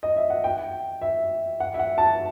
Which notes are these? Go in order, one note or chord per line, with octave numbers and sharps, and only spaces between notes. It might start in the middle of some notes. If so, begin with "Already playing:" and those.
D#5
E5
F#5
G5
E5
F#5
E5
F#5
A5